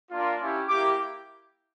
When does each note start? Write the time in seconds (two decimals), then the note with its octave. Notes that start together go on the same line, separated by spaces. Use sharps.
0.11 A#3 D4 F4
0.39 C#4 E4 G4
0.68 A#3 E4 G4 D6